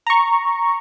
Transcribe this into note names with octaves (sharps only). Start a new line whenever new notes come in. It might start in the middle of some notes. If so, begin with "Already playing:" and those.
A#5 C#6